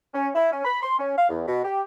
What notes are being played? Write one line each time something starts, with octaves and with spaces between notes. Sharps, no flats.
C#4
E4
C#4
B5
C6
C#4
F5
E2
B2
G4